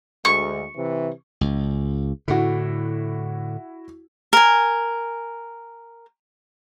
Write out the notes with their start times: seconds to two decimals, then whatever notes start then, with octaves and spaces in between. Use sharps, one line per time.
0.25 D2 G#3 C#6
0.76 C3 E3
1.41 C#2
2.28 A2 D3 E4 F#4
4.33 A#4 G#5